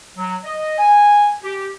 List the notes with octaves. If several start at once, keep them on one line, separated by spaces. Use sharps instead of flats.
F#3
D#5
G#5
G4